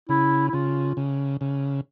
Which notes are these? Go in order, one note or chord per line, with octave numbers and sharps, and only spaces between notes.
C#3 E4
E4
C#3 F4
C#3
C#3